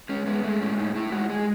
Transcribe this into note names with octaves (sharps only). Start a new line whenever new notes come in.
G#3 C#4
G#3 B3
G#3 A3
A2 C#4
A2 D#4
A2 E4
G#3 F#4
G#3 G#4